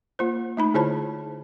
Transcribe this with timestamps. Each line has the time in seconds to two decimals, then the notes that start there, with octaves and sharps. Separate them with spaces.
0.19 A#3 F4 C5
0.57 A3 D#4 B5
0.74 D3 E4 F4 C5 C#5 A5